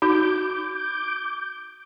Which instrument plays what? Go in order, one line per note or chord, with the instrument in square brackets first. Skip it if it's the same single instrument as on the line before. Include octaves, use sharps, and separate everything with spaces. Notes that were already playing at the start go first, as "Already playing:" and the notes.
[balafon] D#4 F#4 [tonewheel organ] D6 G6